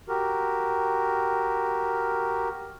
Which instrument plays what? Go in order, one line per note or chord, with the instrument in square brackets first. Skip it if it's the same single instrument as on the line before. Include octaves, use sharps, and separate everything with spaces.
[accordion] F#4 G4 A#4